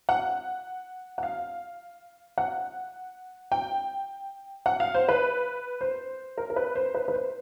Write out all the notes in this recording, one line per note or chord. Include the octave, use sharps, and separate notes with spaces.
F#5
F#5
F5
F#5
G5
F#5
F5
C5
B4
C5
A#4
A#4
B4
C5
B4
B4
C5